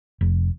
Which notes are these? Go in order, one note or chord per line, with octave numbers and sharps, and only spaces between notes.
F1